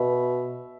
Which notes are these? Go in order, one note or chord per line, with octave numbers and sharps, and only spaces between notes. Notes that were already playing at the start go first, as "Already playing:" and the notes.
Already playing: B2 E5